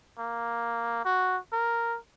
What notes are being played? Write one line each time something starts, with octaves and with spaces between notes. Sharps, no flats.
A#3
F#4
A#4